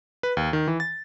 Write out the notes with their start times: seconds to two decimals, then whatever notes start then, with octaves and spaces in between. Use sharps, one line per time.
0.23 B4
0.37 D#2
0.53 D#3
0.68 E3
0.80 A6